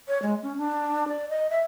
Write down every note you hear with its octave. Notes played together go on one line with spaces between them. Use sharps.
C#5
G#3
C#4
D4
D5
D#5
E5